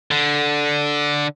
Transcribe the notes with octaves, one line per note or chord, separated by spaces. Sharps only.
D3